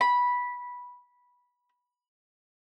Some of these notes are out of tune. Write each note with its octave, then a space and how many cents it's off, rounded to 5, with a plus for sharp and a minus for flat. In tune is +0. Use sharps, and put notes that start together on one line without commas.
B5 -10